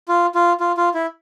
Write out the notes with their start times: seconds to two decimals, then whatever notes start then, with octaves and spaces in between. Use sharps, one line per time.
0.08 F4
0.35 F4
0.60 F4
0.77 F4
0.94 E4